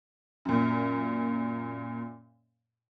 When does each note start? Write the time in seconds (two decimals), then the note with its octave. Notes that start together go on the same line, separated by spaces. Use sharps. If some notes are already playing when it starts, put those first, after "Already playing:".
0.45 F#2 A#2